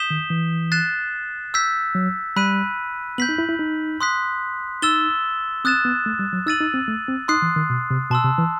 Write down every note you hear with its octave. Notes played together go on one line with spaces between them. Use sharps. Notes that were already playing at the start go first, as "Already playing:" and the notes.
Already playing: D#6 G6 B6 E7 G7
D#3
E3
F#6 A6 C7 E7
E6 G6 B6
F#3
G3 B5 F#6 B6 D#7
B3 G6 B6 F#7
D#4
E4
E4
D#4
C6 D#6 F#6 B6
D#4 E6 A6 E7 G7
C4 D#6 F#6 A6 E7
B3
A3
G3
F#3
D#4 E6 A6 D#7 F#7
D#4
C4
A3
C4
D#4 C6 D#6 F#6 C7
E3
D#3
B2
C3
B2 A5 C6 E6
C3
E3